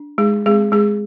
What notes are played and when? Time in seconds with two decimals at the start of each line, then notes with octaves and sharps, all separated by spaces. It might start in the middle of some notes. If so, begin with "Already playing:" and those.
Already playing: D4
0.18 G#3 D#4 G#4
0.46 G#3 C4 G#4
0.72 G#3 G#4